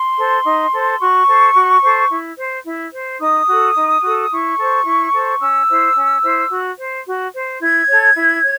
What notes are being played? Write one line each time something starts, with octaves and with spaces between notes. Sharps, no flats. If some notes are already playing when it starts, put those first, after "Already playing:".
Already playing: C6
A4 C5
D#4
A4 C5
F#4 C#6
A4 C5
F#4
A4 C5
E4
C5
E4
C5
D#4 D#6
F#4 A4
D#4
F#4 A4
E4 C#6
A4 C5
E4
A4 C5
C#4 E6
E4 C5
C#4
E4 C5
F#4
C5
F#4
C5
E4 G#6
A4 C#5
E4
C#5